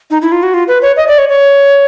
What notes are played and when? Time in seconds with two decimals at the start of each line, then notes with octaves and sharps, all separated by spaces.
0.11 D#4
0.22 E4
0.32 F4
0.43 F#4
0.54 F4
0.68 B4
0.82 C#5
0.97 D#5
1.08 D5
1.18 C#5
1.29 C#5